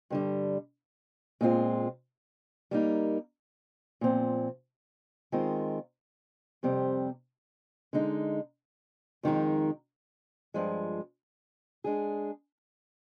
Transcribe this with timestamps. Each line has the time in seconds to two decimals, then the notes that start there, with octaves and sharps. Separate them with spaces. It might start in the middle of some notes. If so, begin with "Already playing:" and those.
0.10 G2 D3 G3
1.41 A#2 G#3 C4 F4
2.71 G3 A#3 D#4 A#4
4.01 A#2 F3 C4
5.32 D#3 G#3 C4 F4 A#4
6.63 F2 C3 G3 C4
7.93 D3 G#3 D#4
9.23 F2 D#3 G#3 D#4 A#4
10.54 G2 F3 G#3
11.84 G#3 D4 G#4